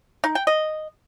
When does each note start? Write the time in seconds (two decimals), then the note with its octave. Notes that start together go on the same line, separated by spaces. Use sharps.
0.24 D#4
0.35 G5
0.47 D#5